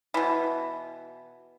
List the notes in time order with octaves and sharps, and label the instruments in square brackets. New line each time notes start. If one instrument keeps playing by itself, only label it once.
[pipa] B2 E3